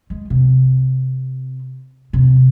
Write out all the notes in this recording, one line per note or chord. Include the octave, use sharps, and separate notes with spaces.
G#3
C3
C3